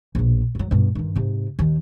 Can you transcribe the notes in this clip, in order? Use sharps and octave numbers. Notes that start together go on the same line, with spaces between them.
A#1 B2
F#2 F#3
G2 B2
G2 D#3
G#2 C3
D#2 D#3